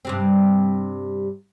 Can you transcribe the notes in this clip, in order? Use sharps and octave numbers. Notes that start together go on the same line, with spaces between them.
G2 C3 C4